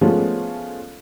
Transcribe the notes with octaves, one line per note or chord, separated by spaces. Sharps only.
F3 G#3 A3 B3 C#4